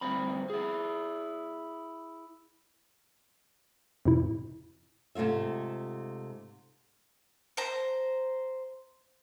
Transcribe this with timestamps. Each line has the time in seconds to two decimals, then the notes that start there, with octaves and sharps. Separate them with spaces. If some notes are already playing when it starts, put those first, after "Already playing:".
0.01 D2 G2 C4 B5
0.50 E4 G#4
4.05 F2 A2 C3 E4
5.15 G#2 C3 A3 F4 E5
7.57 C5 A#5